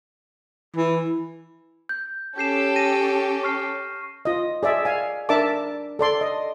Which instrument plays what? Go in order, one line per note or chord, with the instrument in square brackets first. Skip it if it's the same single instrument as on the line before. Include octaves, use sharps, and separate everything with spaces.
[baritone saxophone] E3
[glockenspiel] G6
[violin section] C#4 G4 A4 [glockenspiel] G6 C7 E7
[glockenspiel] A#6 D#7
C#6 F6 C7
[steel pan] F4 D#5
G#4 D5 E5
F5 G#5
D4 A#4 D5 E5 A5 D6
A4 D5 C6
D#5